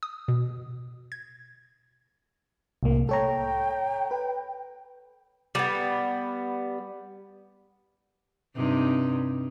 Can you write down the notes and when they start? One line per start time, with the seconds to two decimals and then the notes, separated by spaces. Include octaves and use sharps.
0.03 D#6
0.28 B2
1.12 G#6
2.83 C2 A2 A#3
3.09 A4 C#5 G5 A#5
4.11 B4
5.55 G3 B3
8.56 G2 C3 D#4